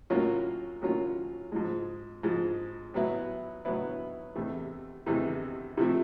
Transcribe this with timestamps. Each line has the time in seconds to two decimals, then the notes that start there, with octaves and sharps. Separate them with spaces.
0.10 A2 F#3 A#3 C#4 F4
0.82 A2 F#3 A#3 C#4 F4
1.52 G#2 F3 G#3
2.23 G#2 F3 G#3
2.94 A2 F#3 B3 E4
3.65 A2 F#3 B3 E4
4.35 E2 C3 E3 A3
5.06 E2 C3 E3 A3
5.77 C3 F3 A3